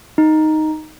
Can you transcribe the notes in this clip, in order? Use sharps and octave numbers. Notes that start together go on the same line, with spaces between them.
D#4